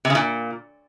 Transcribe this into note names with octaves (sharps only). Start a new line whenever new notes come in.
C3
C#3
A#2